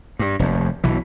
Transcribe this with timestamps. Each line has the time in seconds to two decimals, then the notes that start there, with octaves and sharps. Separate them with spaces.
0.19 G2
0.39 F1 D#2
0.84 B1 B2 E3